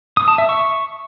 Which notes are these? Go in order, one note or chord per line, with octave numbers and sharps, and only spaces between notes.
D#6
A5
E5
C#6